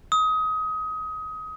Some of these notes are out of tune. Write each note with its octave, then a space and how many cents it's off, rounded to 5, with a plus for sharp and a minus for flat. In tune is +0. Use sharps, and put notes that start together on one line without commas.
D#6 +25